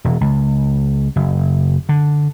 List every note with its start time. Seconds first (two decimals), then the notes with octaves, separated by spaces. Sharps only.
0.04 E1
0.21 C#2
1.16 F#1
1.89 D3